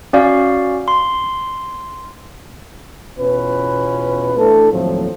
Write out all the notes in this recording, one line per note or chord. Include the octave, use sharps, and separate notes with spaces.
C#4 F#4 D5 F5
C6
E2 B2 C#4 F4 B4
E3 A3 D4 A4
D#2 A2 F3 F#3 A3 C4